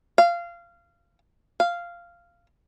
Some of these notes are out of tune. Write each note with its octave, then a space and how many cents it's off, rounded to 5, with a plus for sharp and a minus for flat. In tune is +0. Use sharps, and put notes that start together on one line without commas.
F5 -20
F5 -10